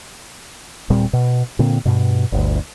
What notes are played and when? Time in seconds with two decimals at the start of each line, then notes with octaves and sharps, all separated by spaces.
0.90 D#1 A#2 G3 C4
1.13 B2
1.59 A#2 D3 A#3 C4
1.85 G2 B2
2.32 G1 D2